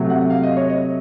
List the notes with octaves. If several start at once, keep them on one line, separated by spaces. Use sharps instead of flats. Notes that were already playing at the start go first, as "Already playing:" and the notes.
Already playing: C3 F#3 A3
F#5
F5
D#5
C#5
D#5